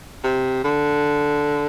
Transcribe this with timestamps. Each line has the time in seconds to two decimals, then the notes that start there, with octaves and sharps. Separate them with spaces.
0.24 C3
0.64 D3